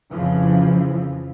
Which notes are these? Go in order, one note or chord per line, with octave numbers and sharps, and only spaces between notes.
F2 C#3 E3 F3